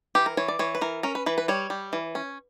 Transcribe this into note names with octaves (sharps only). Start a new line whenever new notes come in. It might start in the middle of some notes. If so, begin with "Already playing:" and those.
E3 G4
A#4
E3 C#5
D5
E3 C#5
B4
E3 A#4
C#4 A#4
B4
E3 B4
B4
G3 C#5
G3
E3
C#4